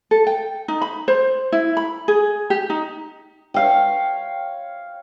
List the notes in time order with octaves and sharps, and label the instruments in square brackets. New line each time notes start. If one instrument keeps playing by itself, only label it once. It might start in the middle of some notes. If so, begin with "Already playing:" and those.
[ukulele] A4
G5
D#4
B5
C5
E4
B5
G#4
G4
D#4
[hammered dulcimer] C#5 F5 G5